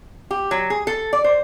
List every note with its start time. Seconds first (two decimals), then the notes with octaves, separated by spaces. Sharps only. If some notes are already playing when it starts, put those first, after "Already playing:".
0.31 G4
0.51 F#3
0.70 G#4
0.87 A4
1.13 D5
1.24 C5